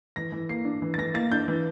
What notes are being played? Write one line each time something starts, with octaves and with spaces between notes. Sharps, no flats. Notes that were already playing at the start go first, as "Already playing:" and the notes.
E3 A#6
E3
A#3 C7
D4
E3
A6
E3 A#6
A#3 A6
D4 G6
E3